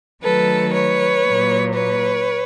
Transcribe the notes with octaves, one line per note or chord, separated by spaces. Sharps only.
D#3 F#3 A3 A4 B4
B4 C#5
A#2 F#3 A#3
B4 C#5